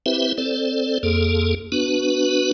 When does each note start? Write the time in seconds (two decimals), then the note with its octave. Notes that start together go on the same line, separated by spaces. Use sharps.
0.06 C4 E4 G4 B4 C5 E5
0.38 C4 A4 C5 D5
1.03 F2 A#3 G#4 A4
1.72 B3 D4 F#4 B4